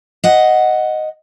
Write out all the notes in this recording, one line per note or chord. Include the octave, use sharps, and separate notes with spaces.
D#5 F#5